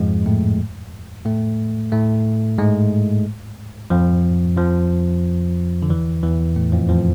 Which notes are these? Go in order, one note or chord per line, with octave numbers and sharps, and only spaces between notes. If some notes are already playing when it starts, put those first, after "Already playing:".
Already playing: F2 G#2 F3 G#3
A2 A3
A2 A3
A2 A3
G#2 G#3
F2 F3
F2 F3
D3
E2 E3
E2 E3
A2 A3
F2 F3
F2 F3